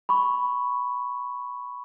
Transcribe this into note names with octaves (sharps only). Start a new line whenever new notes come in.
B5 C#6